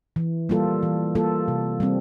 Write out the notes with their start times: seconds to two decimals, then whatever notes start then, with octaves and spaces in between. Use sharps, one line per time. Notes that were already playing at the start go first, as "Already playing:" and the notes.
0.16 E3
0.49 G3 A#3 F4 A4
0.83 E3
1.15 G3 A#3 F4 A4
1.48 C3
1.80 G3 C4